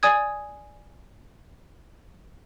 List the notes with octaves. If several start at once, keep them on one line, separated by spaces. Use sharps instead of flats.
D5 G#5 D#6 G#6